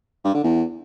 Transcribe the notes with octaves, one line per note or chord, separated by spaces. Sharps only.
G2
D3
E2